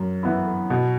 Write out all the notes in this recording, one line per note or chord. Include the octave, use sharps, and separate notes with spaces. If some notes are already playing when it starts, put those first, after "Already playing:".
Already playing: F#2
E3 B3 E4
B2